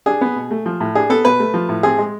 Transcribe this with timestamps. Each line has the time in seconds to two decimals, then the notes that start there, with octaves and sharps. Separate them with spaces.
0.06 D4 G#4
0.21 B3
0.36 B2
0.51 A3
0.66 F3
0.80 A2
0.95 D4 G#4
1.10 B3 A4
1.25 B2 B4
1.40 A3
1.54 F3
1.69 A2
1.83 C4 G#4
1.98 G#3